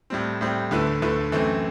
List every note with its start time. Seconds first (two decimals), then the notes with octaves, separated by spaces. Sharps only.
0.10 A2 G3 C4
0.41 A2 G3 C4
0.71 D2 D3 A3 E4 B4
1.02 D2 D3 A3 E4 B4
1.32 F#2 E3 A3 C4